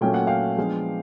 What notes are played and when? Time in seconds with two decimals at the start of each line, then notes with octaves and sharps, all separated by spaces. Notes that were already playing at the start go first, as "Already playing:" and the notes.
0.01 A#2 F#3 A3 C#4 G5
0.14 F#5
0.27 F5 G5
0.57 F3 G#3 B3 D4